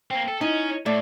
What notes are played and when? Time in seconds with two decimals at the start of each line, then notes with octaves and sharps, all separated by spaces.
0.11 A#3 C4 G5
0.28 A4
0.41 C#4 D#4 E4 D#5 D#7
0.86 A2 A3 D5 D6